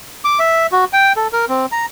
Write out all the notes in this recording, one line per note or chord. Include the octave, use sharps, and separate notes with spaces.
D6
E5
F#4
G5
A4
A#4
C4
A#5